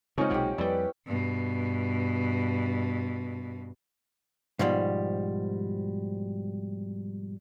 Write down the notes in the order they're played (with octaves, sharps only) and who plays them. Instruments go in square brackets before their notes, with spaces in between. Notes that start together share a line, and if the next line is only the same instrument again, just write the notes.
[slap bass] C#3 G#3 [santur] A#3 C#4 D#5 [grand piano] C4 D#4 F4
[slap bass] B1 C3 G#3 [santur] G4 F#5
[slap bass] F2 G3 [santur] E4 G5 [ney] B4 [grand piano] D5
[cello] G2 B2
[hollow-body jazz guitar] G#2 B2 F3 G3